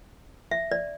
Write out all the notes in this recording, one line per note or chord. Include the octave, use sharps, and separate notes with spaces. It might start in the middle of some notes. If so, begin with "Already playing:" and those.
E5
D5